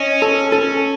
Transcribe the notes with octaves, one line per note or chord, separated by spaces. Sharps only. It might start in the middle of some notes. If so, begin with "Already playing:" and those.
Already playing: C#4 D#5
A4
A4